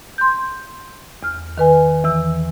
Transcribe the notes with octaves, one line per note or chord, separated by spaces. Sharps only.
C6 G6
E2 F6
D#3 B4 G#5
E2 E3 E6